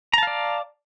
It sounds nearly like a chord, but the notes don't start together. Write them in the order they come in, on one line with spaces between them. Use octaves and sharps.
A#5 A5 F5 D5